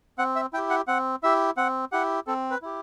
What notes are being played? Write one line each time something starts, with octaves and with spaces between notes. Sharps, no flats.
C4 F#5
E5
E4 G4 G5
F#5
C4 F#5
E4 G4 E5
C4 F#5
E4 G4 F#5
C4 A4
B4
E4 G4